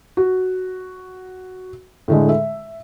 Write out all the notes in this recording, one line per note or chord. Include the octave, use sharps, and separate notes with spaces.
F#4
A2 D3 G#3
E5